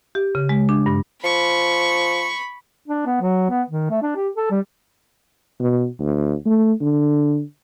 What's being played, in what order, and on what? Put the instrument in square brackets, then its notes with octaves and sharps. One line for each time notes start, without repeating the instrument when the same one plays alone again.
[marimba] G4
C#3
G#3
D4
G2
[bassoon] F3 [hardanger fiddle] B5 [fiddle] C#6
[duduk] D4
B3
F#3
B3
D#3
A3
D4
G4
A4
G3
[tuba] B2
D2
A3
D3